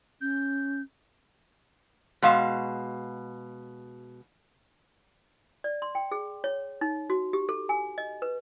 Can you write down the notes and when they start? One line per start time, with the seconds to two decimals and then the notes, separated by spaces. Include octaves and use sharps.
0.21 C#4 G6
2.22 B2 G#3 F5
5.64 D5
5.82 C6
5.95 G5
6.11 G#4
6.44 C#5
6.81 D#4
7.10 F#4
7.33 G4
7.49 A4
7.69 G#5
7.98 D#5
8.22 B4